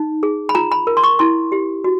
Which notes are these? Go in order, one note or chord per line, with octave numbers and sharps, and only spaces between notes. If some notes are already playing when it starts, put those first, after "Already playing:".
Already playing: D#4
G#4
B5
F4 A#5
B5
A#4
C6
C#6
E4 C6
G4
F#4